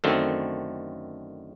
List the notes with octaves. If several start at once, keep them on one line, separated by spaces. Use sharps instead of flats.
F#2 D3 D#3 A3 C4